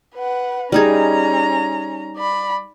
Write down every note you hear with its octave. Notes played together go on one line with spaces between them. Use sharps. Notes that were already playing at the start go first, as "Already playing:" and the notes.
B4 F#5
G3 C#4 D#4 G#4 A#5
D5 B5